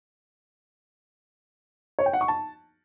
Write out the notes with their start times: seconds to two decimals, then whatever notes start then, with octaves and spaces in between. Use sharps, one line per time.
1.99 C#5
2.06 G5
2.13 F#5
2.21 C#6
2.28 A5